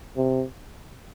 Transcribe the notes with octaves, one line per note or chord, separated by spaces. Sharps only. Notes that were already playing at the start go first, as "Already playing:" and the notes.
C3